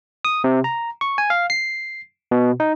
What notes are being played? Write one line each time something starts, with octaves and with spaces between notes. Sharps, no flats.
D#6
C3
A#5
C#6
G#5
F5
C7
B2
D#4